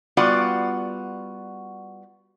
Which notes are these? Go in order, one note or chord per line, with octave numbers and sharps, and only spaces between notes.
G3 B3 F4 F#4 D5 F#5